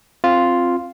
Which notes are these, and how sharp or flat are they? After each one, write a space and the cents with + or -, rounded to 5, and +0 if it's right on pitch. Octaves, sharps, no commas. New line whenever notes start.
C4 +10 F4 +0